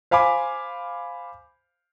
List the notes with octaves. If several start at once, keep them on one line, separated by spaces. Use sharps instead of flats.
C5 F5 G#5 B5 D6